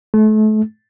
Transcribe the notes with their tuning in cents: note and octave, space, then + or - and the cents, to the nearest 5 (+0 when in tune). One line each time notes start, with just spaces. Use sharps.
A3 -35